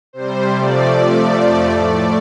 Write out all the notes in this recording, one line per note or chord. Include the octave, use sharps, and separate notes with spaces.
C3 G3 C5
C3 F3 A3 D5
C3 F3 A3
F2 F3 A3
A2 A3 D5